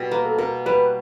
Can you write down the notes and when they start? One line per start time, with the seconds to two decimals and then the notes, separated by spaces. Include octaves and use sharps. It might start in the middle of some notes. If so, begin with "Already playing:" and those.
Already playing: B2 G3
0.11 A#3 B4
0.25 A4
0.38 B2 A#4
0.66 G3 B4